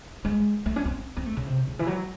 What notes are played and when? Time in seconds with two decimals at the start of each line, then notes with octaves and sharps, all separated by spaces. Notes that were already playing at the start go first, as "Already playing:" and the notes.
0.25 G#3
0.66 A3
0.76 C#4
0.85 C4
1.17 C4
1.26 A3
1.37 C#3
1.46 C3
1.67 C#3
1.79 E3
1.87 F#3